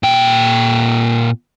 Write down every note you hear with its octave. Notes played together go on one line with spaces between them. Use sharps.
A#2 G5